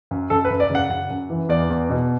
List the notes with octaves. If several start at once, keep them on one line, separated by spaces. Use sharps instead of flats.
F#2
F#2 A4
B4
F#2
D5
C#3
F#5
F#2 F#5
F#2
E3
E2 D5
E2
B2